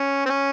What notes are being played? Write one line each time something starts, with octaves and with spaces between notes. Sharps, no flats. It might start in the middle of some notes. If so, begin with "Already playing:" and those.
Already playing: C#4
C4
C#4